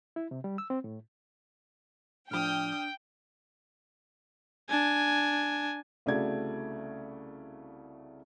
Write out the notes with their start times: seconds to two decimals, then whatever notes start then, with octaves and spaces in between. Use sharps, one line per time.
0.16 E4
0.31 C3
0.44 G3
0.58 E6
0.70 C4
0.84 A2
2.31 A2 F3 D4 G5 D#6 F6
4.70 D4 G#5
6.06 C2 C#3 A3 F#4 D5 G#6